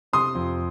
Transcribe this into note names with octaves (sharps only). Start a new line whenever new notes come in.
C3 C6 D#6
F2